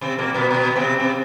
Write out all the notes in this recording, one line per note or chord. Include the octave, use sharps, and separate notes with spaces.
C3 C4
A#2 A#3
B2 B3
B2 B3
B3
C3 C4
C3 C4